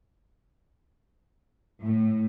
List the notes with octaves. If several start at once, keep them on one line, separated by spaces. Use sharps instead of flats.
A2